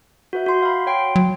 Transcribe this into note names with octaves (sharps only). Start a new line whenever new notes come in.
F#4 B4 E5
F#4 C6
F5 B5
C#5 G5 C6
F#3